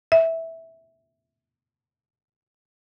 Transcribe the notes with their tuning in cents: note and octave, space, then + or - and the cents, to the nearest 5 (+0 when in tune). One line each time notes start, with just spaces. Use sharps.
E5 -10